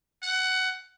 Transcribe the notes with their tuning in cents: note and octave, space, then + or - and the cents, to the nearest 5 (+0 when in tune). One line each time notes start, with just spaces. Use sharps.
F#5 +15